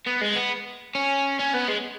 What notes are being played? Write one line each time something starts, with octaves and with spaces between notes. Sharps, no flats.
B3
G#3
B3
C#4
C#4
B3
G#3